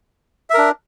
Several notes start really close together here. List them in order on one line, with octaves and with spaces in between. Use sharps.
E5 A#4 D4